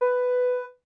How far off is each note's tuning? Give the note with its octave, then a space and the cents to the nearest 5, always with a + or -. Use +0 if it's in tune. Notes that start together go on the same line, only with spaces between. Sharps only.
B4 +10